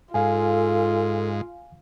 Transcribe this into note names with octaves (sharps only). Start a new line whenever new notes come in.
G#2 F4 A4 F5 G#5